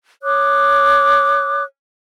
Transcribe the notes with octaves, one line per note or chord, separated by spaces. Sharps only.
C#5 D6 D#6 F#6